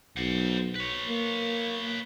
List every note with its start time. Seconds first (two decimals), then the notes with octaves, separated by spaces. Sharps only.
0.17 B1 C5 F#5
0.75 B4 C#5
1.08 A#3